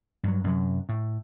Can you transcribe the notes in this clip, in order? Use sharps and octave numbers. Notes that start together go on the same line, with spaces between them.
G2 F#3
F#2 C3 E3 F#3
A2